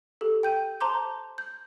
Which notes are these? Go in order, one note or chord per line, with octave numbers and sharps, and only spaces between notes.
G4 A4
G5 G6 D#7
C5 A5 A#5 C6 D6 G6
G6